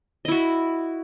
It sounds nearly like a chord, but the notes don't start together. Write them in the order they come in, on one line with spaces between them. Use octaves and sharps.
D#5 E4 F#4